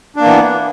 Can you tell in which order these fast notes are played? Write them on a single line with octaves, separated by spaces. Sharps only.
D4 A#3 E3 B3